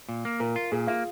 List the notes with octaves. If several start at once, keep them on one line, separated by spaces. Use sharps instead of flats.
A#2
A#3
A#2 A#4
F4
A#2 G#4
A#3 F4